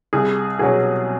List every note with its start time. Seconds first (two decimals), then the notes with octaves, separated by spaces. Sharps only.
0.13 C2 G#4
0.59 B2 F#3 G#4